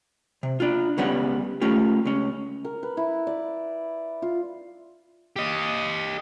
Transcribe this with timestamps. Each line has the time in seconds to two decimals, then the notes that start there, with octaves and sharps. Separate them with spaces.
0.43 C3
0.60 D4 F4
0.98 C#2 C#3 G3 B3 F#5
1.61 A3 C#4 F4 G4
2.05 C#2 C#4
2.65 A#4
2.83 B4
2.97 E4
3.27 D5
4.22 F4
5.36 G4 D#5